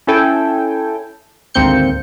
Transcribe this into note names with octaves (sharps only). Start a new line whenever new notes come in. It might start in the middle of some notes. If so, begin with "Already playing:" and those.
C#4 E4 A4 G5 G#5
G#1 D2 A#3 C4 G6 C#7